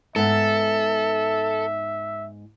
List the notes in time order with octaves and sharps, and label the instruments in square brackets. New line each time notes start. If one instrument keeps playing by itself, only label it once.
[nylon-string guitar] G#2 B3 [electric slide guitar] A4 [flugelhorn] E5